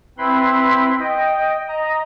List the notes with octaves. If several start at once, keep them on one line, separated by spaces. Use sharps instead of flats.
C4 E4 B4 B5 C6
D#5 G5
D#5 A#5